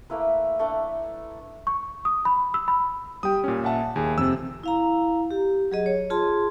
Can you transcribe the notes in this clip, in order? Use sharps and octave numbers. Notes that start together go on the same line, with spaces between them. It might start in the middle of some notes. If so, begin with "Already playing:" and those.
A3 A#3 E4 B4
A3 D4
C#6
D#6
B5
E6
B5
G3 G5 D#6
A#2 C#4
E5 F#5 A5
D#2 G#4
F2 C3 E6
E4 F5 A#5
G4
F#3 G#4 D#5
C#5
F4 G#4 A5 C6